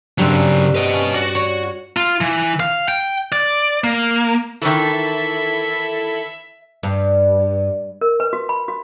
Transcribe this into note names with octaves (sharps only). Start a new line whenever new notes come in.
G2 C#3 F#3 G3 C4
B4 D#5
C#4
F#4 D5
C#5
F4
E3
F5
G5
D5
A#3
D#3 E3 E4 A4 E5 B5
G2
A#4
B4
F#4
B5
F#4